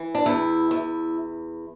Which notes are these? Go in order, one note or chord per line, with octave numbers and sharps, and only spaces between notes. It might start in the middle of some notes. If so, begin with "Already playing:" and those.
Already playing: E3
D4
E2 E4
E2